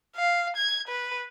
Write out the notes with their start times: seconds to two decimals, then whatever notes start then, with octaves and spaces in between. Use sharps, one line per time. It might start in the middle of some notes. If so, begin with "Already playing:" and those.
0.16 F5
0.57 G#6
0.88 B4